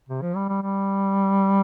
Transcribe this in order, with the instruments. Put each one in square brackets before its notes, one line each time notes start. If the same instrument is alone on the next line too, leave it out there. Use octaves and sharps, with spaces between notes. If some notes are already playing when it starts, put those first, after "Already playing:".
[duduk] C3
F3
G3
G3
G3